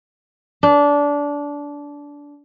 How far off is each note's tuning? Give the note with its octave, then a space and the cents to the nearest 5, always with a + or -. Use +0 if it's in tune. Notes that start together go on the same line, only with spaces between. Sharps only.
D4 -20